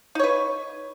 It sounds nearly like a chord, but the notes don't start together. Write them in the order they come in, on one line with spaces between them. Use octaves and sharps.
D#4 C#5 B4